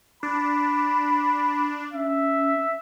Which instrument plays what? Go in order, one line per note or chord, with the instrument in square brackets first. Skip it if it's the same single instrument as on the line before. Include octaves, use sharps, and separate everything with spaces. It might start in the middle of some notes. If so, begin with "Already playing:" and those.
[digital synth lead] D4 [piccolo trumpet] B5
[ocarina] C#4 [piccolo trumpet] E5